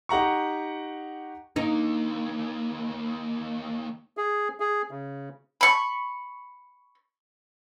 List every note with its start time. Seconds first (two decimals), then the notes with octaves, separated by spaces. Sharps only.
0.09 D#4 G4 F#5 A#5 C#6
1.56 D#2 A#3 D#4
4.17 G#4
4.60 G#4
4.91 C#3
5.61 B5 C#6